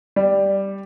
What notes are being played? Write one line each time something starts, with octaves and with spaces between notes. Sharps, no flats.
G3